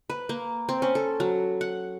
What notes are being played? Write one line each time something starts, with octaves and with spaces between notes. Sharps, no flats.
B4
A#3
C4
C#4
A4
F#3
F#5